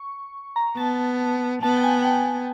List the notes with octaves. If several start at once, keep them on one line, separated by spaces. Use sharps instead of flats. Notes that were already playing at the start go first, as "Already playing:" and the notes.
Already playing: C#6
A#5
B3 A5
B3 A5
G5
G#5
G5